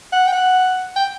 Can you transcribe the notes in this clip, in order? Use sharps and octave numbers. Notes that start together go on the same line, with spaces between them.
F#5
G5
F#5
G5